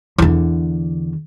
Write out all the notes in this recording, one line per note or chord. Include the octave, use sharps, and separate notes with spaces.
E2 D3